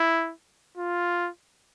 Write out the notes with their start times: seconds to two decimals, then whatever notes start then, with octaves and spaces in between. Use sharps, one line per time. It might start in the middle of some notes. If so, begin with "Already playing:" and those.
Already playing: E4
0.77 F4